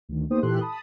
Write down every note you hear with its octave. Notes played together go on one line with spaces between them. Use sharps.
D2 D#3
A#3 B3 D#4 G4 C5 D#6
A#2 E3 G4 A4 C6 F#6
A5 B5 D#6